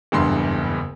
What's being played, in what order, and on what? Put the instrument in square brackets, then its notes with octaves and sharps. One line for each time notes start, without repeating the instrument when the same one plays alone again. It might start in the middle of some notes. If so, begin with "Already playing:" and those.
[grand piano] F#1 E2 G2 C6